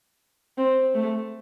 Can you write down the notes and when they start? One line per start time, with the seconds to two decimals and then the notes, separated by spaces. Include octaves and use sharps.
0.58 C4
0.95 A3